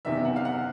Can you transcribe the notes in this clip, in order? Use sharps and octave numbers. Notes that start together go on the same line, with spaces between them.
F#1 E2 C3 D#3 E5
F#5
F5
F#5